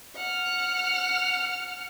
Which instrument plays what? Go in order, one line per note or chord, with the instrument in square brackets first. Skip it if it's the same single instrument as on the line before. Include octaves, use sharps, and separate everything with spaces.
[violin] F#5 F6